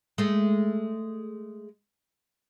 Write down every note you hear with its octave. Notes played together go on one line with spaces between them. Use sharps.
G#3 A3